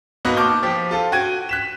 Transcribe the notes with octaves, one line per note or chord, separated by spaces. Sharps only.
B2 A#3 B3 D#4 F#4 B4
A5 C#6 D6 F6 G6
F3 G4
F4 A4
F#4 G5 G#6 D#7
F#6 B6 E7